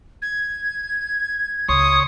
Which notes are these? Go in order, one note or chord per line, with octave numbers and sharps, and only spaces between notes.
G#6
C#2 C#5 C6 C#6 D#6